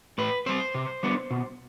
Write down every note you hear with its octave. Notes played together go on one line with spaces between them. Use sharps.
A2 B4
G3 C4 C5
C3
G3 B3 D4
B2